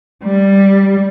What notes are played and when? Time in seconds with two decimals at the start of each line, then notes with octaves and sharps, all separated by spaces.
0.24 G3